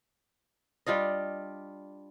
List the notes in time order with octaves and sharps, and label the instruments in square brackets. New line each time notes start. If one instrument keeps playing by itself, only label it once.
[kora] G3 D4 F4 D#5